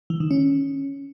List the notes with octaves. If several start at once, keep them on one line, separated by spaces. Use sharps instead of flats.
E3
D#3
C#4